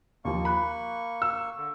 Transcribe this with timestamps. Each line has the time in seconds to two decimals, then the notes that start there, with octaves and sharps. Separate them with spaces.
0.25 D#2 F3 A#3 C#6
0.45 B5 F#6
1.22 E6
1.57 D3